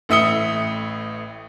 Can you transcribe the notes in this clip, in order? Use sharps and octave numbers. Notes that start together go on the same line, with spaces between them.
A1 A2 E5 D#6 C#7 G7